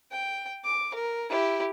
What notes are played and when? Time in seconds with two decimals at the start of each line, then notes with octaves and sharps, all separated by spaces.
0.12 G5
0.64 D6
0.94 A#4
1.30 E4 G4